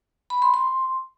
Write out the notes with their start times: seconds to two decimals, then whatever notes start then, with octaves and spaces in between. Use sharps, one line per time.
0.30 B5
0.42 C6
0.54 C6